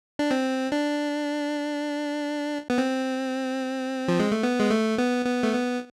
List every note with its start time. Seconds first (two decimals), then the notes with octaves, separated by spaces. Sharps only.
0.19 D4
0.31 C4
0.72 D4
2.70 B3
2.78 C4
4.08 F3
4.19 G#3
4.32 A3
4.43 B3
4.59 G#3
4.71 A3
4.98 B3
5.26 B3
5.43 A3
5.54 B3